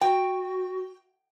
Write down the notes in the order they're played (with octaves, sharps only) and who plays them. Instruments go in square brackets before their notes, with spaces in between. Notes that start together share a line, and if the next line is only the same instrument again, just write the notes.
[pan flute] F#4 [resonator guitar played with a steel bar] G5